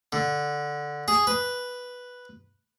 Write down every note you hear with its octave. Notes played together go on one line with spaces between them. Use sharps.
D3
G#4
B4